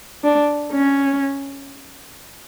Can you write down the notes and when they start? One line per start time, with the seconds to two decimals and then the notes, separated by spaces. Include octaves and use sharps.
0.24 D4
0.73 C#4